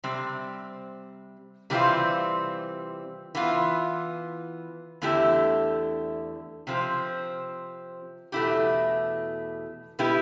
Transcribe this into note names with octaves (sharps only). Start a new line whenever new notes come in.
C3 G3 C4
C3 E3 G3 C4 F4
E3 B3 F4
E2 D3 A3 E4 G4
C3 F3 C4
E2 B2 A3 E4 G4
B2 G3 B3 E4 G4